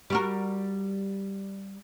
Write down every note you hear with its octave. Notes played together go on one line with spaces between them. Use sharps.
G3 F#4 A#4